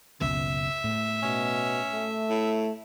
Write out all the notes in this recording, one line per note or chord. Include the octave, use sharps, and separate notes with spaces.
F#1 C#2 B2 E5
A2
B2 C#4
A3
A2